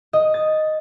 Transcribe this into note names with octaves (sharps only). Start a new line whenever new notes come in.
D#5
A6